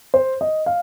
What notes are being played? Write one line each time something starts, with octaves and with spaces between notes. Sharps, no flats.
C5
D#5
F5